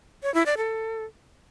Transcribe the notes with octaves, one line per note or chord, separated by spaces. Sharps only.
C#5
E4
D5
A4